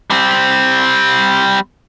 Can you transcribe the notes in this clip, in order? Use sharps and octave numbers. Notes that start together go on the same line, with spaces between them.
G3 C4